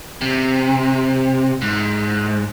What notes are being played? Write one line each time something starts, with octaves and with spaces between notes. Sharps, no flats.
C3
G#2